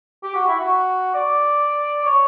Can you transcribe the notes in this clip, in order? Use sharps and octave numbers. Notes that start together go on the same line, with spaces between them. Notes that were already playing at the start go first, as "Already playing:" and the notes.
G4
F#4
E4
F#4
D5
C#5